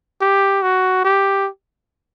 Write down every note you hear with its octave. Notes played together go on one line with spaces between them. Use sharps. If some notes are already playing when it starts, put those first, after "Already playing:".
G4
F#4
G4